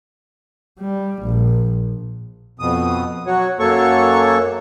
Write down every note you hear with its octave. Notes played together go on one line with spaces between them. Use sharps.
G3
A#1
F2 B2 D#6
F#3 F#4 C#5
F#2 F#3 A#3 A4 C#5 C#6